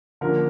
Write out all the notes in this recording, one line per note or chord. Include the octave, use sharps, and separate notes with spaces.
D3 F3 A#3 C#4 A#4